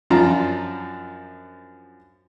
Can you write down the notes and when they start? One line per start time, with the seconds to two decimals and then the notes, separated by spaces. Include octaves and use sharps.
0.10 F#2 F3 D4 F4 A#5